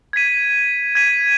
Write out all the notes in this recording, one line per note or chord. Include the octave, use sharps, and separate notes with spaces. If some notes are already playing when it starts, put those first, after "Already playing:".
G#6 B6 D#7
G#6 B6 D#7